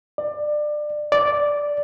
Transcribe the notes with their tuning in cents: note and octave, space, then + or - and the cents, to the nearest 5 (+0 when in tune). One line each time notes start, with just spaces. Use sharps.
D5 +25
D5 -5